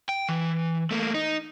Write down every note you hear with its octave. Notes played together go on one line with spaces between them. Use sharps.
G5
E3
A3 A#3
D#4